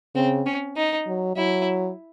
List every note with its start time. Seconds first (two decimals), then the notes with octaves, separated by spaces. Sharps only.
0.15 C#3 C4
0.46 C#4
0.77 D#4
1.07 F#3
1.36 F#3 E4